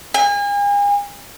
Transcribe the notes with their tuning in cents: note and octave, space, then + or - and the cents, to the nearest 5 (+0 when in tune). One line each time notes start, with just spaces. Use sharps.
G#5 -40